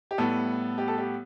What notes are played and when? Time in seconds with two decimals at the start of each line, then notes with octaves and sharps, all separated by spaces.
0.11 G4
0.18 A2 G3 B3 A4
0.78 G4
0.88 A4
0.98 G4